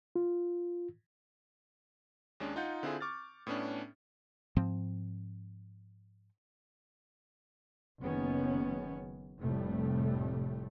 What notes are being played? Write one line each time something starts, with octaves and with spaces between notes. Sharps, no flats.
F4
D#2 G#3 C#4 D4
D#4 F4 F#5 G6
D3 C4 E4 F4 G#4
C#6 D6 F6 A6
A2 B3 C#4 D4
G#2 F3 C4
F#1 D#3 B3 C#4
F1 A2 C3 G3 A3